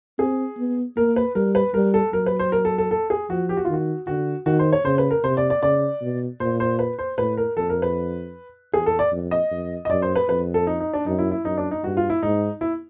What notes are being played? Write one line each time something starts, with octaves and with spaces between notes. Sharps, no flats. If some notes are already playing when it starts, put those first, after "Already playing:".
C4 G#4
B3
A#3 A#4
B4
G3 A#4
B4
G3 A#4
A4
F#3 A#4
B4
C5
A#4
A4
A4
A4
G#4
F3 F#4
G4
F#4
F4
D#3
F#4
D3 F#4
D#3 F#4
C5
C#5
C#3 C5
B4
A#4
C3 C5
D5
D5
C#3 D5
B2
A#2 C5
C5
B4
C5
A2 B4
A#4
F2 A4
A#4
B4
E2 G#4
A4
D5
F2
D#5
F2
D#5
F#2 D5
C5
B4
F2 B4
A4
D#4
D#4
D4
F#2 D#4
E4
E4
F#2 D#4
D4
D#4
G2 F#4
F4
E4
G#2 D#4
E4